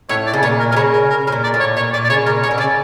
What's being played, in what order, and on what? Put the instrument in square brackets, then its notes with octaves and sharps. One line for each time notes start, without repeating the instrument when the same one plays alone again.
[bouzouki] A2 [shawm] C#5
[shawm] D5
[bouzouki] C#3
[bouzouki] A#2 [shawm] C#5
[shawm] A#4
[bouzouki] A#2 [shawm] A#4
[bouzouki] C#3 [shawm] C#5
[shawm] A#4
A#4
[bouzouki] A2 [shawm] A#4
[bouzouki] A#2
[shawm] D5
[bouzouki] A2
[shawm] C#5
[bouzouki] A#2 [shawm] C#5
[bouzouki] A#2 [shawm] D5
[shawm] D5
[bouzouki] C#3 [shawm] C#5
[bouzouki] A#2 [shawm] A#4
[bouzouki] C#3 [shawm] C#5
[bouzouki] D3
[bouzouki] C#3 [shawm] D5